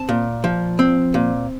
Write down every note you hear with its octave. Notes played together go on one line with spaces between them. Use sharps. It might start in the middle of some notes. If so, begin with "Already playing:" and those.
Already playing: C4 A5
A#2
F3
C4
A#2